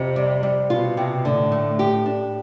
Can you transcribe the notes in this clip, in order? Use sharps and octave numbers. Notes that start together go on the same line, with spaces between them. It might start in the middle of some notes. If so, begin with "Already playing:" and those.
Already playing: F2 C3
G3
G3
B2 F4
C3
A2 D3
A3
G4
D4